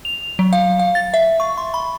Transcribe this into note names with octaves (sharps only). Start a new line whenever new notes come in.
F7
F#3
F5
F5
A6
E5
C#6
C6
B5